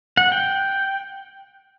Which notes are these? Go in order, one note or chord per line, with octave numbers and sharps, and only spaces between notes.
F#5
G5